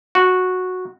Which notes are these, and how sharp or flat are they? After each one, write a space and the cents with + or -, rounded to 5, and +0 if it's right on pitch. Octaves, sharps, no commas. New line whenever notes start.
F#4 -10